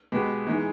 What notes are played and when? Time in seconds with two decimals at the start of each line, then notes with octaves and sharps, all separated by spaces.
0.12 B2 G#3 B3 G4 B4
0.46 E3 G#3 D#4 G#4